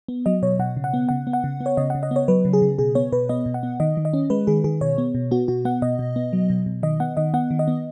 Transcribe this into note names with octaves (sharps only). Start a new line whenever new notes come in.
B3
F#3 D#5
B2 C#5
B2 F#5
C#3
F#5
B3
C#3 F#5
B3
F#5
C#3
B3
C#5
C#3 D#5
F#5
C#3
D#5
B3 C#5
F#3 B4
C#3
G#4
C#3
B2 G#4
B3 C#5
B2 B4
B3 D#5
B2
F#5
B3
D#3 D#5
D#3
D#5
C#4
G#3 B4
D#3 G#4
D#3 G#4
B2 C#5
B3
B2
B3 F#4
B2 F#4
B3 F#5
B2 D#5
B2
B3
F#3
B2
B2
D#3 D#5
B3 F#5
D#3 D#5
B3 F#5
D#3
D#5
B3